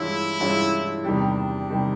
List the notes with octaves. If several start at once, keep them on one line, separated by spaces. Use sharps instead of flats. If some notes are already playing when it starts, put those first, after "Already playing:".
Already playing: G2 E3 G#3 C#4 E4 F4
G2 E3 G#3 C#4 F4
E2 C3 D#3 G3 D4
C3 D#3 G3